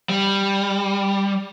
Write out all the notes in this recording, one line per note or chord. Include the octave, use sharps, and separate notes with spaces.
G3